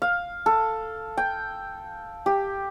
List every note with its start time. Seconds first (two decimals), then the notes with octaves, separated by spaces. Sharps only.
0.02 F5
0.46 A4
1.17 G5
2.26 G4